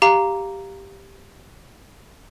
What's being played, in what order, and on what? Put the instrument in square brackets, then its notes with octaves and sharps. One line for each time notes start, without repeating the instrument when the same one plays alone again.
[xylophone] G4 F5 A#5